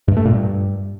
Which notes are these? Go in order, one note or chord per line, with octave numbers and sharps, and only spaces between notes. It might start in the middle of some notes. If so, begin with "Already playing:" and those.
G2
A3
A#2
G2